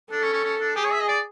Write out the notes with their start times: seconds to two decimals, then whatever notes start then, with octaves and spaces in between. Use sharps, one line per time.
0.11 D4 A4
0.22 C#4
0.33 C#4
0.44 C#4
0.60 D4
0.76 G4 G#4
0.85 C#5
0.92 E5
1.00 D#5
1.08 D5